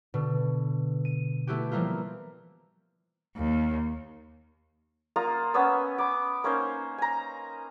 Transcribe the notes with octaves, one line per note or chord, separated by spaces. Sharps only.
B2 D3
D#7
A3 B3 E4 F#4 G4
E3 F3 G3 A#3 E4 F4
D#2
A#3 F4 A#5 D#6
B3 C#4 D#6 E6
B5 D6
A#3 C#4 D#4 C5
G#5 A#5